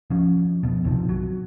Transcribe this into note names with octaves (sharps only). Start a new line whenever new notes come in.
F3 C#4
F2 B2
A#1 C3 D#3 F3
F#3